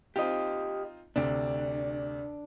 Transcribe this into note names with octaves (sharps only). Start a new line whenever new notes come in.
C4 D#4 F4 G4 D#5
D2 C3 D4